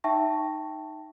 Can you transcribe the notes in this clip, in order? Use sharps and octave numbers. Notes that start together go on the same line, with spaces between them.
D#4 E5 G5 A5 C#6 A#6